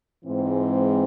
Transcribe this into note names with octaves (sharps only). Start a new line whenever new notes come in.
G#2 E3 G#3 C4